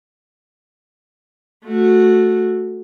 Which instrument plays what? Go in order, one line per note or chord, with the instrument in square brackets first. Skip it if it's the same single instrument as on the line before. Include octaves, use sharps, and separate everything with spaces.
[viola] A3 F#4